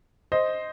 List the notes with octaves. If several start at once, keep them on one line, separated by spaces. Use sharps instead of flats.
C5 D#5